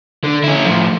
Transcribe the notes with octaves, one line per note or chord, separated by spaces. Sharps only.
D3
C#4 E4
A2 F3